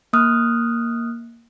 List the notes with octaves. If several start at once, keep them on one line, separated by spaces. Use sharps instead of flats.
A#3 D#6 F6 F#6